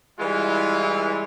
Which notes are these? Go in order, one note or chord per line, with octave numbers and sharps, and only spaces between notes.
E3 G3 G#3 E4 F4